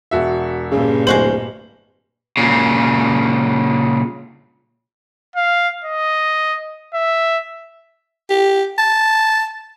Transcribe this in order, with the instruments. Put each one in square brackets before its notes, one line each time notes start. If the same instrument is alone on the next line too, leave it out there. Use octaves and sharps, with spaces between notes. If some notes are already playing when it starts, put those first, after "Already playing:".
[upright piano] E1 F#4 E5
[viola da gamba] G2 A#2 [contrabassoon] C#3
[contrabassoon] D1 [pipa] G#3 F#4 C5 [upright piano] F#7
[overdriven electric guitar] A#2 C#3
[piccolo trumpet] F5
D#5
E5
[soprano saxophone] G4
A5